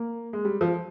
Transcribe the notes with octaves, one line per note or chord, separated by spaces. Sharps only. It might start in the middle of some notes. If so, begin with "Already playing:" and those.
Already playing: A#3
G#3
G3
F3